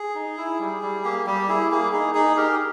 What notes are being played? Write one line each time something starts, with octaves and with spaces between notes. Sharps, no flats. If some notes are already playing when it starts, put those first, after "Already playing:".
Already playing: G#4
D#4
E4
G3
G3
A#3 G4
G3 G4
E4 G#4
A#3 G#4
D#4 G#4
D#4 G#4
D#4 G4 A#4